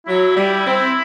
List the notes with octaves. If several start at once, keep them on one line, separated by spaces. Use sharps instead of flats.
F#3 E4
G3
C4